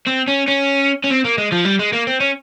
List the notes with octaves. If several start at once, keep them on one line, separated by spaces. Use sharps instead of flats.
C4
C#4
C#4
C#4
C4
A#3
G#3
F3
G3
G#3
A#3
C4
C#4